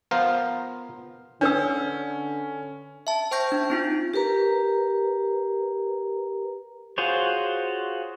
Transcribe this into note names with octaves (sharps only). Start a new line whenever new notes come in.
B3 F4 A#4 C5 F5
D3 C#4 D4 B4 E6
E5 A5
C5 G5 C#6 G6 A#6
D4
C4 D#4 F4
G4 A#4 B4 A#5
F4 F#4 G#4 C5 C#5